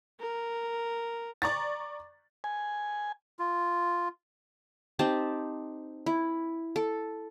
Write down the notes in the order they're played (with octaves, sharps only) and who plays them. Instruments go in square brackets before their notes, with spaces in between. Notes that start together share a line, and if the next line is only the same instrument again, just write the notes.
[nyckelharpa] A#4
[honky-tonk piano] D5 A#5 C#6 A6
[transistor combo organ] G#5
[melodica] F4
[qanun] C4 D#4 G4 A5
E4
A4